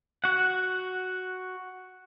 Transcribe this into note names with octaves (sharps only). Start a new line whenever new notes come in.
F#4 F#5